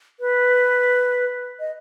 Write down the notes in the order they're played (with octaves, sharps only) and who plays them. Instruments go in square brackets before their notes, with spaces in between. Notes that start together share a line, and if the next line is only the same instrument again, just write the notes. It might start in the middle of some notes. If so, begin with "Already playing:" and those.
[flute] B4
D#5